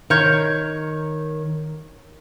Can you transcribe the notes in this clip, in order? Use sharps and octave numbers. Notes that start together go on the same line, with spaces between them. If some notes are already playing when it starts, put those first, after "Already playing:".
D#3 A#4 C#5 G6